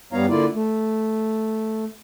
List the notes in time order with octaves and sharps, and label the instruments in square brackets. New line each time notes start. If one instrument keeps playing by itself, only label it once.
[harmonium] G2 G3 B3 C#5 F5 A#5
D3 A#3 E4 F4 D5
A3